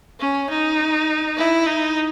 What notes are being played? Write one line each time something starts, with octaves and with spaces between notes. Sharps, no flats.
C#4
D#4
E4
D#4